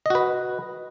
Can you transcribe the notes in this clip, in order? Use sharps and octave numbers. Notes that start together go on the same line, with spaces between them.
F#4 B4 D#5